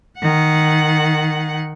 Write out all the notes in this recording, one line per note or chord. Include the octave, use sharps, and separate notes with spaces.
D#3 F#5